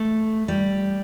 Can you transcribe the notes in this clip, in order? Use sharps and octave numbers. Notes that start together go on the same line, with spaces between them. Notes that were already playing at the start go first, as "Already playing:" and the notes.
Already playing: A3
G3